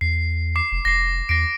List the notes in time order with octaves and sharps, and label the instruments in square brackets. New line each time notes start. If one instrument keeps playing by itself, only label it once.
[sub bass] E2 [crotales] C7
[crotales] D6 C7
[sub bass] F1
[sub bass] F1 [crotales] A#6 C7
[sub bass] E2 [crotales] A#6 C7 D7